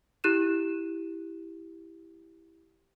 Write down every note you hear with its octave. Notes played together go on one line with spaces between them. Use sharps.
E4 G4 F#6 D#7 E7